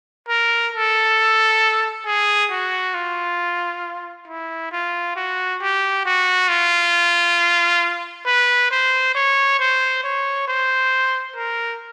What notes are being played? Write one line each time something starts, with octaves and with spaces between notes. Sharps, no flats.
A#4
A4
G#4
F#4
F4
E4
F4
F#4
G4
F#4
F4
B4
C5
C#5
C5
C#5
C5
A#4